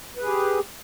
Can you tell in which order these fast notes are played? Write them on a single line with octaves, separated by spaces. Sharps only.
B4 G#4 G4